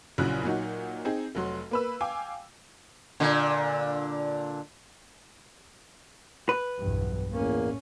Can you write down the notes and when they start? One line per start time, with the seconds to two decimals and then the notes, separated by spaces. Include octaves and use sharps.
0.18 A#1 C#3 F#3 E4 F#6
0.44 A#2 F#3 D#4 F#4
1.05 C4 D#4 G#4
1.35 F1 F#3 C6
1.71 A#3 B4 E6
2.01 F5 G5 G#5 D6
3.20 A#2 D3
6.49 B4
6.80 B1 E2 G2
7.32 E2 A2 A#3 C#4